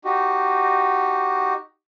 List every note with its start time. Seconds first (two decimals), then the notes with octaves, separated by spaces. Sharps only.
0.05 D#4 F#4 G4